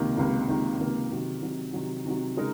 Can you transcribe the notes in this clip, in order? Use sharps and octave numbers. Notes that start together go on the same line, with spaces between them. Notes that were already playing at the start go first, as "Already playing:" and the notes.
Already playing: C#2 C3 D#3 A#3
C#2 C3 D#3 A#3
C#2 C3 D#3 A#3
C#2 C3 D#3 A#3
C3 D#3 F#3
C3 D#3 F#3
C3 D#3 F#3
C3 D#3 F#3
C#3 G#3 D#4 A#4